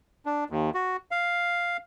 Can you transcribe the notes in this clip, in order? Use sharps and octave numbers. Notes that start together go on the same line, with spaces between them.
D4
D#2
F#4
F5